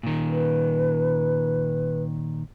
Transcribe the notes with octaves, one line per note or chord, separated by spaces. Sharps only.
A#2 D#3
B4